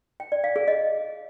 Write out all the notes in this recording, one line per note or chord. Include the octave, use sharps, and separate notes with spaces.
G5
D5
F5
G#4
D#5